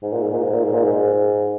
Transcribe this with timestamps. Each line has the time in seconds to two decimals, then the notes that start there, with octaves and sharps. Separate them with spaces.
0.02 G#2
0.13 A#2
0.23 G#2
0.33 A#2
0.44 G#2
0.54 A#2
0.64 G#2
0.74 A#2
0.84 G#2